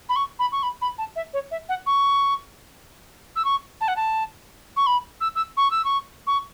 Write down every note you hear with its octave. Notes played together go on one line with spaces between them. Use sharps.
B5
C#6
B5
C#6
B5
B5
A5
E5
C#5
E5
F#5
C#6
E6
C#6
A5
F#5
A5
C#6
B5
E6
E6
C#6
E6
C#6
C#6